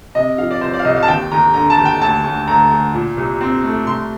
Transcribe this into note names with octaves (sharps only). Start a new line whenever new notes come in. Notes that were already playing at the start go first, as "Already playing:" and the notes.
C3 D#5
F3 F5
D5
C2 C5
D5
F5
C2 D#5
F5
A5
D#2 G5
D#2 A#5
D3 A#5
A5
D#2
G5
D2 A5
D2
D2 A#5
D2
A#2
C2
C4
A3
C2 C6